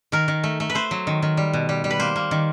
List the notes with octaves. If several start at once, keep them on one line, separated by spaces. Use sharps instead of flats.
D#3 A#4
D#3
A3
A3
B4
A3 C5
F#3
D#3
D#3
G3
B2
G3
G3
B4
A#3 C5
A#3
D#3